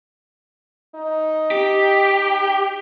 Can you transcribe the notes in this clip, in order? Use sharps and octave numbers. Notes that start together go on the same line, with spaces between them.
D#4
G4